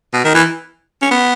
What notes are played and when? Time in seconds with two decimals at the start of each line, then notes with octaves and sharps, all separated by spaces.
0.13 B2
0.25 D#3
0.35 E3
1.02 C#4
1.11 B3